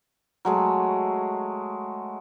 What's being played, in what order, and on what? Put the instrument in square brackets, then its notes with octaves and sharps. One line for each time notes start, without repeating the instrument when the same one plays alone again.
[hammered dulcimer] F#3 G#3 A3